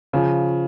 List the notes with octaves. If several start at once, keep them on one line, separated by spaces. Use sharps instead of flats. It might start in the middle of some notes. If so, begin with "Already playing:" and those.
C#3 F3